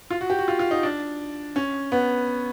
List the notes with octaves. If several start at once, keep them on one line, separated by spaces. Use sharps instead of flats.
F4
F#4
G4
F#4
F4
F4
D#4
D4
C#4
B3